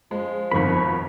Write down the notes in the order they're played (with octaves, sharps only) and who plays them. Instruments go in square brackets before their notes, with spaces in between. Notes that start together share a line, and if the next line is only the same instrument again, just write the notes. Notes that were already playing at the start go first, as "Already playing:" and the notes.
[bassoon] F3 [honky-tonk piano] G#3
[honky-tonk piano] G1 A#4 [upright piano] F2 B2 D#3 [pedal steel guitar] B5 C#6